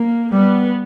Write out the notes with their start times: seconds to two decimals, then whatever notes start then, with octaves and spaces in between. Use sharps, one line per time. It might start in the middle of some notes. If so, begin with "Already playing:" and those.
Already playing: A#3
0.31 G3 B3